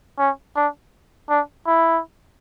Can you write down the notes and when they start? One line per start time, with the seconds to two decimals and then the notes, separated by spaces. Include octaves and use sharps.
0.19 C#4
0.56 D4
1.30 D4
1.67 E4